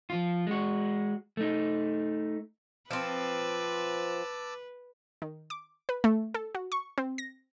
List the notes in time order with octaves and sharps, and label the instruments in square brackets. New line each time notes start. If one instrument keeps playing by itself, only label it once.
[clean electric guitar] F3 F4
G#3 F#4
A3 D#4
[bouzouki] F3 C4 [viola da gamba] B4 [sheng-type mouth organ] A5 D6 E6
[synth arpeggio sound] D#3
D6
B4
A3
A4
F#4
C#6
C4
A#6